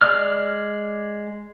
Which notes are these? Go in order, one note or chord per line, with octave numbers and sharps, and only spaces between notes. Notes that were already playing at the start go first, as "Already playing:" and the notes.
G#3 D5 F6